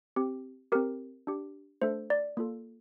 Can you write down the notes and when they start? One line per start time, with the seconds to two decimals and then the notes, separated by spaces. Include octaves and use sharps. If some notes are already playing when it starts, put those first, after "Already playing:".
0.16 C4 G4
0.72 C4 G4 A#4
1.27 D4 G4
1.82 A3 D4 A4 C5
2.10 D5
2.37 A#3 F4 A4